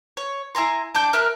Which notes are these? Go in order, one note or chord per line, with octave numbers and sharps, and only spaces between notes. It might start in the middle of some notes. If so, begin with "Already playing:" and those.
C#5
E4 G#5 A#5 C6
D4 G5 D6 G6
A#4 E5 F6 F#6